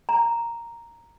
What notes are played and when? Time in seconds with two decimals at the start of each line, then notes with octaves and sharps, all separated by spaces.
0.09 A#5